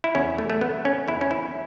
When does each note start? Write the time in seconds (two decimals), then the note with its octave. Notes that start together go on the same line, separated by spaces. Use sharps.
0.04 E4
0.15 E2 C#4
0.38 A3
0.50 A3
0.61 E3 B3
0.85 C#4
1.08 E2 E4
1.21 C#4
1.31 E4